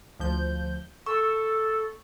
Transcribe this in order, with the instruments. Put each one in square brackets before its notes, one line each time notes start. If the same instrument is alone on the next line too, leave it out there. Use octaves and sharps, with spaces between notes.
[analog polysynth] D2 F3 G6
[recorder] A4 [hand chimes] C#6 [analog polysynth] E6